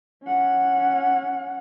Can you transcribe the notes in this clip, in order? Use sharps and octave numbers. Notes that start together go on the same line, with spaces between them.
C#4 F#5